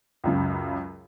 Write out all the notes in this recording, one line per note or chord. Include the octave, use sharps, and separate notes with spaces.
C#2 F#2 C#3